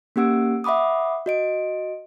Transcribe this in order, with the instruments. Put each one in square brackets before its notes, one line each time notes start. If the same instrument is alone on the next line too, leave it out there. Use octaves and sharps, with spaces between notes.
[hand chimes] A#3 C#4 G4 F#5 E6 D7
E5 F#5 B5 D6 D#6
F#4 D#5 D7